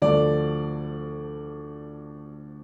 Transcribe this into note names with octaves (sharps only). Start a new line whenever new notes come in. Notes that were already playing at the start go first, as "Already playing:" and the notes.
D2 D3 F3 D5